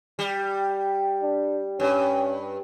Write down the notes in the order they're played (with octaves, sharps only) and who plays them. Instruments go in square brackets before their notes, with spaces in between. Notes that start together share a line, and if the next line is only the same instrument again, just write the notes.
[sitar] G3
[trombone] D4
[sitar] G2 [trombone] C#4